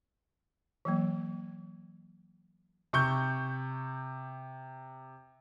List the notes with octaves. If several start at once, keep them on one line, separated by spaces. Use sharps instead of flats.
E3 F#3 A#3
C3 C#6 G6